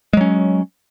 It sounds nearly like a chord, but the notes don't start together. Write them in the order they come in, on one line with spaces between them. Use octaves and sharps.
G#3 F#3 C#4